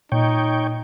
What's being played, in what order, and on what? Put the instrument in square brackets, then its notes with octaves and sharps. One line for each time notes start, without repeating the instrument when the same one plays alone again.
[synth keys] A#2 [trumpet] D#4 [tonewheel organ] C#5 G5